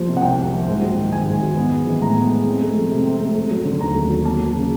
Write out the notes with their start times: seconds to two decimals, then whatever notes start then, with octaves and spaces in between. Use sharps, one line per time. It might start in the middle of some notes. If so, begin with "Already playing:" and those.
Already playing: F3 G3 A#3
0.08 C3
0.17 F#5
0.22 C2 G5
0.38 A#3
0.52 F3
0.67 G#2
0.82 F#3
0.97 D#3
1.12 G#2 G#5
1.27 G#2
1.42 F#3
1.57 B3
1.72 G#3
1.87 E3
2.02 A2 A#5
2.16 B3
2.31 G#3
2.46 C4
2.62 A3
2.76 F3
2.91 C3
3.05 C4
3.20 A3
3.36 A3
3.51 F#3
3.65 D3
3.80 D#2 A#5
3.95 A3
4.10 F#3
4.25 A#3 A5
4.39 F#3
4.55 C#3